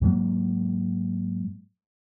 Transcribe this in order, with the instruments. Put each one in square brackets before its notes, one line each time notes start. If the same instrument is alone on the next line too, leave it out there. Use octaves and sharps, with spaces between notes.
[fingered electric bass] G#2 F#3 G#3 A#3